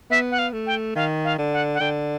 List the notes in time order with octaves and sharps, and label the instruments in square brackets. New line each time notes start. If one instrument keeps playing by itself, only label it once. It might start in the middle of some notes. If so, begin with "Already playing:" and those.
[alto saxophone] B3 [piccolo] E5
[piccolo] F#5
F5
[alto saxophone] A3
[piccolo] G5
[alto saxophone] D#3 [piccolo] F5
[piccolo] F5
[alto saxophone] D3
[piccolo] F#5
F#5
[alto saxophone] D3 [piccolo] G5